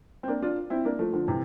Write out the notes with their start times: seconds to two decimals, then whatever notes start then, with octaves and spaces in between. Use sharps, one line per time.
0.23 C4
0.28 A#3 D4
0.42 D4 F4
0.70 C4 E4
0.85 A#3 D4
0.99 F3 A3
1.13 D3 F3
1.28 C3 E3